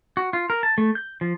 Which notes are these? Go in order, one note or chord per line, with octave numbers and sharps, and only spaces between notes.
F#4
F4
A#4
A5
A3
G6
F3